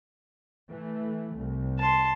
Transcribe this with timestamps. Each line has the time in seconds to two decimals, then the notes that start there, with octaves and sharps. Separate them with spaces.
0.69 E3 A3
1.36 C2
1.79 A5 C6